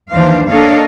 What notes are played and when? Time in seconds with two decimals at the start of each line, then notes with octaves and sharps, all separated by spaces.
0.11 D#2 E3 F3 D4 C5 F5
0.49 A#3 D4 A4 C#5 D#5 F5